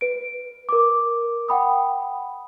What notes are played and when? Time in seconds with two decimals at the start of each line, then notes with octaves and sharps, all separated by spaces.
0.01 B4 D7
0.69 A#4 D6
1.49 F#5 G5 B5 D#6